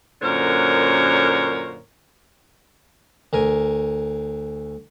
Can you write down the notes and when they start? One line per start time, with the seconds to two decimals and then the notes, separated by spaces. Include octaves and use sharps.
0.21 F#2 A#2 D3 A#4 C5 C#5
3.33 D2 A#4 G#5